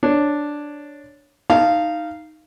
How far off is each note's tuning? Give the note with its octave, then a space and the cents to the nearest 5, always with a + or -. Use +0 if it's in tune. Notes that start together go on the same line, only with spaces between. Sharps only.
D4 +0 C#5 +0
D#4 +0 F5 -10 A5 +5